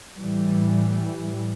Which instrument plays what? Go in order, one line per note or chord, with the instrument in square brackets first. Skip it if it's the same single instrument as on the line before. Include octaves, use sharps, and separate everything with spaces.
[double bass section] A2 E3 G3